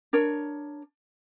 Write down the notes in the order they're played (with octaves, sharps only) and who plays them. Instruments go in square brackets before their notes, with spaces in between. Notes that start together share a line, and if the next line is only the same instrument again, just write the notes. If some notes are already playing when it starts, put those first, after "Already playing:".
[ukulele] D4 A#4 C#5